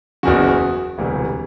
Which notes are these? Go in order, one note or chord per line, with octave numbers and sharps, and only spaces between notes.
F#1 E2 C#3 F#4
E1 D2 C3 E3 G3